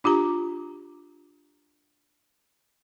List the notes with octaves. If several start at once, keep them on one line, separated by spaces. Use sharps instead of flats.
D4 F4 G4 A#5